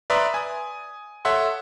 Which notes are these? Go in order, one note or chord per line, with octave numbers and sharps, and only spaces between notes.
B4 D5 E5 A#5 C6 D#6
G#5 D#6
A4 C#5 E5 F#5 C6